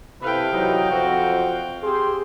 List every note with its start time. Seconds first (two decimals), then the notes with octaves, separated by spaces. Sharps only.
0.22 C3 E4 A4 B4 F5 G5
0.52 E3 F#3 D#4
0.90 F2 C4 F#4
1.83 C4 G4 G#4 C6